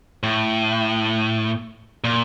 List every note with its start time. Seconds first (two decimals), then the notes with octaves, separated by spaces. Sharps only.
0.23 A2
2.04 A#2